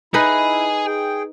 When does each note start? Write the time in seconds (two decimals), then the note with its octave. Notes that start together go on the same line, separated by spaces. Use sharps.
0.14 D#4 E4 G#4 B4 G#5
0.86 G#4 G5